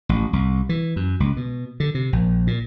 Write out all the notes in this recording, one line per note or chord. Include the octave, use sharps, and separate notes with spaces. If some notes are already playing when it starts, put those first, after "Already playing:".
A1
C2
E3
F#2
C#2
B2
D3
C3
A#1
A#2